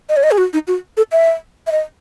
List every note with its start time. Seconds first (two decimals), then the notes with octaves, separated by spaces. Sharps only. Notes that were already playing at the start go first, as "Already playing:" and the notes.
0.09 D#5
0.17 C#5
0.23 D#5
0.31 G#4
0.38 F#4
0.53 D#4
0.67 F#4
0.97 A4
1.12 E5
1.67 E5
1.71 D#5